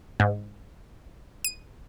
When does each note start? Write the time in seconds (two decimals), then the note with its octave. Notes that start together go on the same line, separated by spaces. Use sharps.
0.20 G#2
1.44 D#7